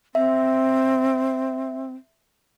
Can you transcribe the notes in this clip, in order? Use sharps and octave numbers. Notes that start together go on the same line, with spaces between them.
C4 E5